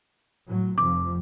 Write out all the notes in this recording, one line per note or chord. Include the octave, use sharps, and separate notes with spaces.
A2 F#3
F1 F2 F3 D6